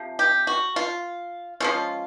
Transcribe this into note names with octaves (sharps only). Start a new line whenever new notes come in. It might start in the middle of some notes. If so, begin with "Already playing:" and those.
Already playing: C3 F3
G4
F#4
F4
F3 G#3 C#4 F4